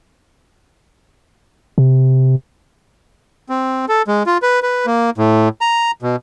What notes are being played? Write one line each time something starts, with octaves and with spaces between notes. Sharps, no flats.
C3
C4
A4
G#3
F4
B4
B4
A#3
A2
A#5
B2